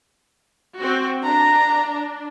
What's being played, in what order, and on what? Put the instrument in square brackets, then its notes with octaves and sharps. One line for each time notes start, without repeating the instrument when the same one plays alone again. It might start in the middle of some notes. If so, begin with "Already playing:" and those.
[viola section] C4 F#4
[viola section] D4 [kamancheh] A#5